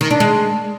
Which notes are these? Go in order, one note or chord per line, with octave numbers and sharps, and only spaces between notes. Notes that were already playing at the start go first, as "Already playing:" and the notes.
D#3
D4
G#3